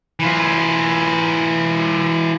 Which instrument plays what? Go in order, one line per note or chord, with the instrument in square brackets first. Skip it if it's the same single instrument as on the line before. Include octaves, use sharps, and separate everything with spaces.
[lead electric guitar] E3 F4